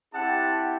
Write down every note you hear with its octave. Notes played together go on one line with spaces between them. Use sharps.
C4 E4 G4 F#5 A5